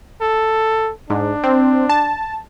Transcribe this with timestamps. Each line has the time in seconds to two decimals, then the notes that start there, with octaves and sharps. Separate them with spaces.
0.21 A4
1.10 G#2 D4
1.44 C4
1.89 A5